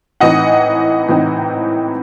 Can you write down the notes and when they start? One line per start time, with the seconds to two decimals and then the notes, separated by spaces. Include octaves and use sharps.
0.20 A2 E3 C4 D#4 D#5 F#5
1.08 A2 E3 C4 D#4